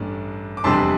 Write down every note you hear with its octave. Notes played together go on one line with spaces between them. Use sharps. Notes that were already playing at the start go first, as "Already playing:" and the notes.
Already playing: A1 G2 A3 D4
D6
F1 E2 C3 G3 D4 A5 C6